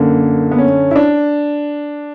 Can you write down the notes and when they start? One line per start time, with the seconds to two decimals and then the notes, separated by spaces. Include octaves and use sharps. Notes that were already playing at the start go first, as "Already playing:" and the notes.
Already playing: F#2 D3 A#3
0.51 B3
0.58 C#4
0.91 E4
0.96 D4